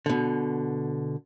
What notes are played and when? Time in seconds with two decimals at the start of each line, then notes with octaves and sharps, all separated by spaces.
0.06 B2 D3